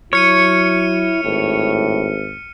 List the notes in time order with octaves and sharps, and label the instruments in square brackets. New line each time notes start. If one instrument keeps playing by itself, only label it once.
[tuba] F#3 [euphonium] E4 [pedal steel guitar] C#5 [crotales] F6 C#7 D#7
[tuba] G#1 [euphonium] A2